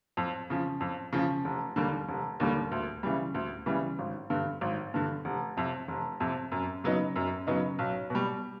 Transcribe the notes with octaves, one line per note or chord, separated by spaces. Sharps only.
F2
C#3 F3
F2
C#3 F3
F1
D#2 D3 G3 A#3
F1
D#2 D3 G3 A#3
D2
C#3 E3 G3
D2
C#3 E3 G3
G#1
G2 D3
G#1
G2 D3
F1
F2 C3
F1
F2 C3
F#2
C#3 F#3 B3 D#4
F#2
C#3 F#3 B3 D#4
B1
B2 G3